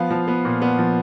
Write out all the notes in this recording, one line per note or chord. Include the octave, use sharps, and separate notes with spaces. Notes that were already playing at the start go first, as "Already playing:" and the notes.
Already playing: F3 B3 F5
F3
B3
A#2
B3
F3